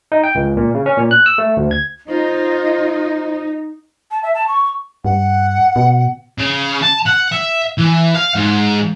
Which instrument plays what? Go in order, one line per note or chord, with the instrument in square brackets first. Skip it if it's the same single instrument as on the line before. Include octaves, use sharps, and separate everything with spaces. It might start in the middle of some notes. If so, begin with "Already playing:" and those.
[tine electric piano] D#4
G5
C#2
A#2
C#3
C#4
A#2
F#6
E6
A3
D2
G#6
[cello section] D#4 [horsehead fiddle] F4 [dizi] C5
[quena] A5
E5
A5
C#6
[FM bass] G2 [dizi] F#5
[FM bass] B2
[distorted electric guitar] C#3
A5
F#5
E5
E3
F5
G#2